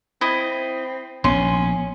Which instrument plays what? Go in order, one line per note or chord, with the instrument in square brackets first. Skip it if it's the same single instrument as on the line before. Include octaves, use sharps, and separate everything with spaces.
[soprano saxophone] C4 [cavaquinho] E4 D#5
[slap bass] A#1 B3 [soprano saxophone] C#4 [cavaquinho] C6